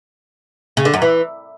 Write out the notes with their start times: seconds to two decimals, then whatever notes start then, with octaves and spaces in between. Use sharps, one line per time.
0.77 C#3
0.85 D3
0.94 F#2
1.02 E3